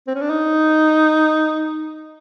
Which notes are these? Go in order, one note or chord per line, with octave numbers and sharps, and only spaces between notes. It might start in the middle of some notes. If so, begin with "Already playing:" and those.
C4
C#4
D4
D#4